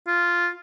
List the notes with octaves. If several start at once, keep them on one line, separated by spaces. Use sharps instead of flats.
F4